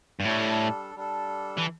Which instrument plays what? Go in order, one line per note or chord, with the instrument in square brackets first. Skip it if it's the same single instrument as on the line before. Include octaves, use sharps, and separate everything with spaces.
[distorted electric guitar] G2
[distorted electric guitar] A2 [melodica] G3 D4 A4
[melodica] G3 D4 A4
[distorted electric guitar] E3